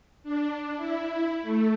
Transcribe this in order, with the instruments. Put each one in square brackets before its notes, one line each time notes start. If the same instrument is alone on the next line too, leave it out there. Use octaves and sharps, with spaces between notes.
[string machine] D4
E4
A3